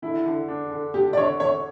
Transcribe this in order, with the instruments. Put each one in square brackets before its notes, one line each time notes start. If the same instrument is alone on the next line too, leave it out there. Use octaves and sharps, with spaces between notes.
[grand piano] D3 [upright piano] E4
[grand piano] D3
D4
D3
[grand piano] D4 [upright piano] G4
[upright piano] D5
[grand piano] D3 [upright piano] C#5
[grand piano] D3 [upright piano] C#5